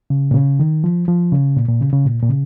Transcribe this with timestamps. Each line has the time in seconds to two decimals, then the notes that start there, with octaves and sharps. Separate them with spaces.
0.10 C#3
0.31 A#2
0.34 C#3
0.60 D#3
0.84 F3
1.08 F3
1.32 C#3
1.56 A#2
1.68 A#2
1.81 C#3
1.93 C#3
2.05 A#2
2.23 A#2
2.30 C#3